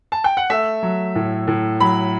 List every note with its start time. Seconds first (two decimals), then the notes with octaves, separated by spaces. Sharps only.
0.12 A5
0.24 G5
0.37 F#5
0.50 A3 E5
0.83 F#3
1.15 A2
1.48 A2
1.81 F#3 B5